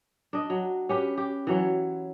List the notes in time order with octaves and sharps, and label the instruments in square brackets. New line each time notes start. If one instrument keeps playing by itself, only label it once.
[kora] D4 D#5
F#3
C#4 G4 B4
G4
E3 F#3 C#5